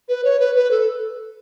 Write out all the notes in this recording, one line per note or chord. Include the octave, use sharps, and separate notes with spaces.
B4
C#5
B4
B4
A4